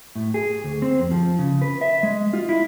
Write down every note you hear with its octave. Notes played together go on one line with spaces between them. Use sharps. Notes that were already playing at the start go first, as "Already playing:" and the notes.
A2
G#4
D2
C4
F2
F3
C#3
B4
E5
G#3
F4
E4